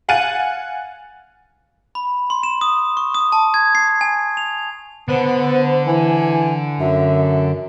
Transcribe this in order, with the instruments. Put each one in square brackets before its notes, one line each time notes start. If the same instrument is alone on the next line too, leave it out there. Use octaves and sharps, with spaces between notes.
[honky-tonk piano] F5 F#5 G#5 A6 D#7
[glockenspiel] B5
C6
E7
D#6
C#6
D#6
A5
G#6
C7
G#5
F7
[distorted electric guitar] D3 [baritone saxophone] B3 [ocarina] C5
[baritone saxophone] E3 [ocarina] G#5
[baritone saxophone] F#2 [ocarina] E5